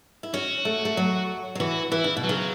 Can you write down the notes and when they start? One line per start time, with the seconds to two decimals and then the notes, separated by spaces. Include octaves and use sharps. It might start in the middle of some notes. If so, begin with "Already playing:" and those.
0.23 E4
0.34 C#4 F#4
0.65 A3
0.85 A3
0.97 F#3
1.55 F#3
1.60 E3 F#4
1.92 E3 E4
2.04 C#3
2.17 B2
2.24 F#3
2.29 C#3